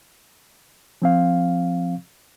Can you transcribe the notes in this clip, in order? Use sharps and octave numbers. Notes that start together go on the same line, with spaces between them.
F3 C4 F5